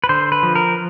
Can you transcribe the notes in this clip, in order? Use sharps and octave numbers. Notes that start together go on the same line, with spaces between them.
B4
D3 C5
B4
F3
A#4